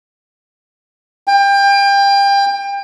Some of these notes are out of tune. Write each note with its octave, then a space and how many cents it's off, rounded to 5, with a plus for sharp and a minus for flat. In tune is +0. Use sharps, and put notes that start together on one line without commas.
G5 +30